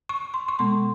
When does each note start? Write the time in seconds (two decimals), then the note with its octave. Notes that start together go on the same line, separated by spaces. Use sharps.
0.09 C#6
0.34 C6
0.48 C#6
0.59 B2 G#3 B3 C6